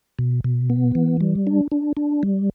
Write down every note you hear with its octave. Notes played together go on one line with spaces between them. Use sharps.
B2
B2
B3
E3
G3
D4
D4
D4
G3